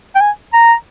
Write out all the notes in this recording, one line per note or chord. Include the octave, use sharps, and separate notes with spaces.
G5
G#5
A#5